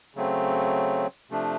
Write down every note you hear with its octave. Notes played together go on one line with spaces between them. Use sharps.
C#3 F#3 A3 C4
C3 F3 A3 D4